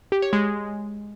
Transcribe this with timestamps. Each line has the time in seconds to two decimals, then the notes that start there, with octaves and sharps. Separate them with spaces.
0.12 G4
0.22 C#5
0.33 G#3